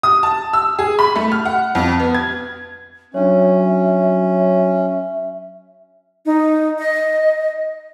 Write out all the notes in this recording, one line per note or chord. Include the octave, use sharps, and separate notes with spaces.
D#6
A5
E6
G#4
B5
A3
F6
F#5
F2
B3
G#6
F#3 C#4 D4 C#5 E5
D#4
D#5